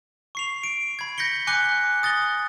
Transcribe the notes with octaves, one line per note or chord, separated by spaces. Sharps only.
C#6 C7 F7
D7
B5 G#6
G6 A#6 B6 C#7 G7
G#5 D6 F#6 C#7 G7
D#6 A6 A#6 G7